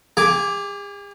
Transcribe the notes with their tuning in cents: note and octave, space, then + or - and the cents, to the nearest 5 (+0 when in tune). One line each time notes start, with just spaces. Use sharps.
G#4 -45 G#5 +0 D6 +0